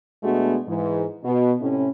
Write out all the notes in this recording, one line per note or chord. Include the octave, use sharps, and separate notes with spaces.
B2 G#3 A3 B3 D4 F#4
G#2 E3
B2
A2 C3 C#4